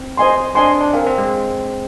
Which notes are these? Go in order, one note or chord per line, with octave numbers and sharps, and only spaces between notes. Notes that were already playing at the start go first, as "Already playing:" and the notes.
Already playing: C4
C5 D#5 G#5 C6
D4 C5 D#5 G#5 C6
D4
C4 A#4 F5 G#5
C4
G#3